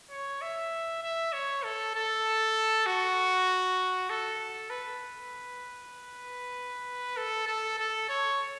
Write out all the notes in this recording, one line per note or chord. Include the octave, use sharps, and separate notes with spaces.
C#5
E5
E5
C#5
A4
A4
F#4
A4
B4
A4
A4
A4
C#5